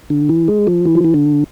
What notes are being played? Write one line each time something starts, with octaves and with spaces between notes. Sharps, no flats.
D3
E3
G#3
F3
E3
F3
E3
D3